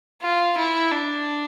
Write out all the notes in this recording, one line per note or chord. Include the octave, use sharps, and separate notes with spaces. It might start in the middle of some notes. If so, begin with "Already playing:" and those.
F4
E4
D4